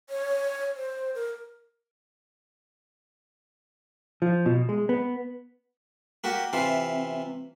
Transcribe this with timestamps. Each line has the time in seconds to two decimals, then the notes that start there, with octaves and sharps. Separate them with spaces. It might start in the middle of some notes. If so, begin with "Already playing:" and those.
0.10 C#5
0.76 C5
1.15 A#4
4.22 F3
4.46 B2
4.69 G#3
4.89 B3
6.24 A#3 F#4 G4
6.53 C3 E3 C4 F4